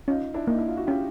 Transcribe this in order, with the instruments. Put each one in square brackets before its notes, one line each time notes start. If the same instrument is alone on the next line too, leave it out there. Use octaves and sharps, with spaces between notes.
[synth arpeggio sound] C#4 [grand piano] D#4 F4
[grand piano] D4 E4
[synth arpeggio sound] A#3 [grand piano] D#4
[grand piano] E4
F4
F#4
[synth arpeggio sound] C#4 [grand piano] F4 G4